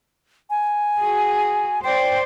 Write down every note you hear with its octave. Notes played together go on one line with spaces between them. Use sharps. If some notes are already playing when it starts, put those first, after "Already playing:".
G#5
F#4 G#4
C5 D5 G5